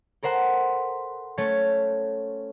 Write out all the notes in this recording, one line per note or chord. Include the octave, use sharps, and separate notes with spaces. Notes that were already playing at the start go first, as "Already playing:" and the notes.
A4 A#4 C5 F#5 B5
A3 C#4 A5 G#6 C#7